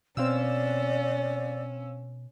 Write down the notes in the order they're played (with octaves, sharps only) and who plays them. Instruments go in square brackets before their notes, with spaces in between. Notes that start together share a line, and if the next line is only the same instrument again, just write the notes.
[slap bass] B2 [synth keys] C4 F5 E6 [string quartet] C#4 [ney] D5